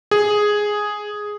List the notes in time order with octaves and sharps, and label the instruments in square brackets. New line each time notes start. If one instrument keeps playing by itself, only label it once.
[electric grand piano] G#4